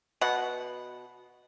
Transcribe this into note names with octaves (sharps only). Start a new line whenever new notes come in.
B2 F#5